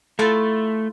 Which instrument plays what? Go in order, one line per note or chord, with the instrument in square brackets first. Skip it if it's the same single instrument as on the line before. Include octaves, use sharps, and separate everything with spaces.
[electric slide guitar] A3 [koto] E4 F4 A4